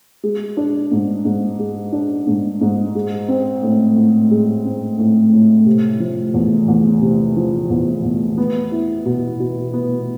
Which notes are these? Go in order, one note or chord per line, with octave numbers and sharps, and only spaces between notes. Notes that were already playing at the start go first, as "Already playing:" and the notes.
G#3
D4
G#2
G#2
G#3
D4
G#2
G#2
G#3
C4
A2
A2
G#3
C4
A2
A2
C3
F3
E2
E2
C3
F3
E2
E2
B3
E4
B2
B2
B3